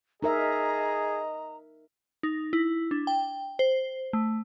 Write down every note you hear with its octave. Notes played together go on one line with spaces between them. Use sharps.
D#4 G#4 A#4 D#5 E5 A#5
D#4
E4
D4
G5
C5
A3